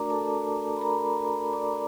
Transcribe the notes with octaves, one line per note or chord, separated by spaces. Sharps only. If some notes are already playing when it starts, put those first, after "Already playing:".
Already playing: A3 D4 F#4 A#4 D5 A#5 D6
A4 A5
B5
A#4 A#5
D5 D6